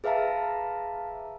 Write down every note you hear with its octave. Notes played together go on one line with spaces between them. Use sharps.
G#4 B4 E5 F5 A5 A#5